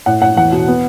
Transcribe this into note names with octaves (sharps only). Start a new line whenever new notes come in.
A2 F#5
A2 F#5
E2 F#5
B2
B3